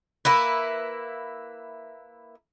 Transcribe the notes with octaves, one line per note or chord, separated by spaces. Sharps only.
A#3 E4 B4